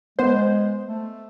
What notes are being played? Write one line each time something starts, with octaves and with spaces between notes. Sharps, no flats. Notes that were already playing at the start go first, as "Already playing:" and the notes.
G#3 B3 C5
A3